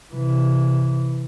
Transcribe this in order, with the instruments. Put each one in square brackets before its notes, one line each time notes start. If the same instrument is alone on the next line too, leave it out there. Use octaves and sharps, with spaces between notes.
[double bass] C3 E3